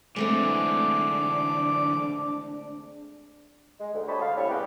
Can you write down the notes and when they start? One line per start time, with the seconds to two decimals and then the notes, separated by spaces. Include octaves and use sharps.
0.16 D3 E3 G#3 A3 C4 D4 D6
3.80 G#3
3.94 D2
4.08 G4 C5 C#5 D#5 A5 B5
4.21 D3 F5
4.36 A2 C3 G3 A4 C#5 B5
4.49 G3 G#3 B3 C#4 G4